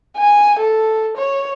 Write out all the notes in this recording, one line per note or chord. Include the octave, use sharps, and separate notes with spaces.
G#5
A4
C#5